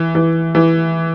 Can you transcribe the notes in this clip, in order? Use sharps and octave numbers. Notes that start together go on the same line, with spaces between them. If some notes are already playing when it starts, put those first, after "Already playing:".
Already playing: E3
E3
E3